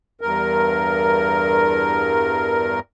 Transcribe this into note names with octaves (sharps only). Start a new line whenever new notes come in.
E2 G2 A#4